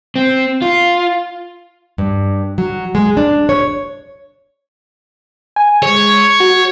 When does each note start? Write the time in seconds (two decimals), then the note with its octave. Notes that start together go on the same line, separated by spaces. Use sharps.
0.16 C4
0.62 F4
1.98 G2
2.58 F#3
2.95 G#3
3.17 D4
3.49 C#5
5.56 G#5
5.82 G#3 C#5
6.40 F#4